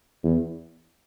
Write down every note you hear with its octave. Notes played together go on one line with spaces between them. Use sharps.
E2